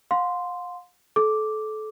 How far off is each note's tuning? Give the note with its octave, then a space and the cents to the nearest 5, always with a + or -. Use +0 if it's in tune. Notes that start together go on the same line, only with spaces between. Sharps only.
F5 +40 C6 -10
A4 -30 D6 +0